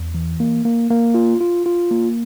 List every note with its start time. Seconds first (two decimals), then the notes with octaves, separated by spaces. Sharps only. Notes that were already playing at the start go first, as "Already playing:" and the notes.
Already playing: E2
0.14 E3
0.40 A#3
0.65 A#3
0.90 A#3
1.14 F4
1.41 F4
1.66 F4
1.91 A#3